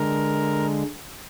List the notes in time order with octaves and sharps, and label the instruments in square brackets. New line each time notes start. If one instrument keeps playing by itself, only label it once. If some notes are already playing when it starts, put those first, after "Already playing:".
Already playing: [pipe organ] D3 G#3 A#4